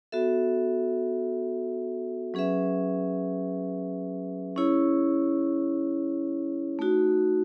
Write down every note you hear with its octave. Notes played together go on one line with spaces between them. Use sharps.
B3 F#4 A4 E5
F#3 C#4 G#4 B4 E5
C#4 E4 G#4 C#5
A3 D#4 F#4